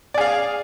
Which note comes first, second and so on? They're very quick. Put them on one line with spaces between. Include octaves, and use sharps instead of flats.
D5 G#4 F5